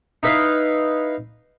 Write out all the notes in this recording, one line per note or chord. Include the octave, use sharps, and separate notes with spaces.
D#4 E4 B4 E5 F5